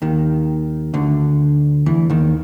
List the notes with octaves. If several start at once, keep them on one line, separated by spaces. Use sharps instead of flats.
D#2 D#3
D2 D3
E2 E3
D#2 D#3